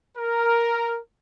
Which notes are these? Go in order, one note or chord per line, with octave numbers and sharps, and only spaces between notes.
A#4